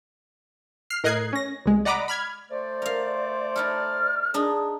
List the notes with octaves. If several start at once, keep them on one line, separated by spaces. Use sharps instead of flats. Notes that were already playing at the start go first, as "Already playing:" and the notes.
F6 C7
A2 A#4 D#5 F#6 G#6 C7
C#4 A#6
C2 G#3
D5 D#5 F#5 A#5 B5 D6
B5 F6 G#6
A3 C5 D5
A#4 F5
D#4 E4 A4 F6
D4 D#4 G#4 D#6